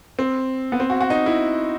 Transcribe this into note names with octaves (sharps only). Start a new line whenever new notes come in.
C4
B3
C4
F#4
F#4
D#4
E4